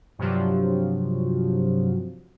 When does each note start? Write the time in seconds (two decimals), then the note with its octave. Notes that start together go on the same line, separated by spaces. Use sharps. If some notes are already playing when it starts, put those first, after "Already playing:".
0.19 G2 C3 F3 F#3